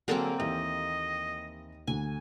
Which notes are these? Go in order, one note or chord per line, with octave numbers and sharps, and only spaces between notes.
D3 F#3 A#3 C4 G#4 A4
D#2 E3 G4 D#5 E5
D2 G#5